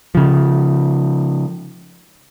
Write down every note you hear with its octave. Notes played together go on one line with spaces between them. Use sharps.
C#3 F3